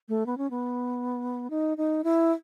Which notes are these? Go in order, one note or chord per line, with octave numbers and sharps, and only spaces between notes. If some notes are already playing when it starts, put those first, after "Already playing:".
A3
B3
C#4
B3
D#4
D#4
E4